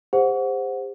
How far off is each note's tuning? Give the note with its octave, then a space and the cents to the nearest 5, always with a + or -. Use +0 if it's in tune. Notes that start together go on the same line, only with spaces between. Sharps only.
G4 +45 C5 +0 F#5 -15